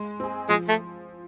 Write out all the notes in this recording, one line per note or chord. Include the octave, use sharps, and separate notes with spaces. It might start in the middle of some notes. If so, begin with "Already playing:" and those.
Already playing: G#3
C4 G#4
F3 G#3
A3